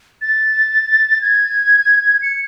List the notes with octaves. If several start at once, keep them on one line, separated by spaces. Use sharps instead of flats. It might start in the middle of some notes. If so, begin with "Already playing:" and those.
A6
G#6
C#7